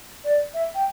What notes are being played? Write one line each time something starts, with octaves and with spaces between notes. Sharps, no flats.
D5
E5
G5